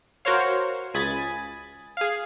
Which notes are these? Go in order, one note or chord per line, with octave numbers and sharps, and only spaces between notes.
F#4 A#4 C5 C#5 F5
C#2 G#5 B5 D#6 A6
G#4 F5